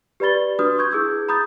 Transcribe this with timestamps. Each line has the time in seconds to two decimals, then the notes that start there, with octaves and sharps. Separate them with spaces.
0.20 G4 B4 D5 B5 A6 G7
0.59 D4 F#4 B4 D#6 F6
0.78 C#6 G6 G#6
0.91 E4 G#4 D6 E6 G6
1.29 A#5 B5 D#6 G6 A6